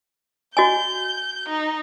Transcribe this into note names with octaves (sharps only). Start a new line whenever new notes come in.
F#4 D#5 G#5 G6
D#4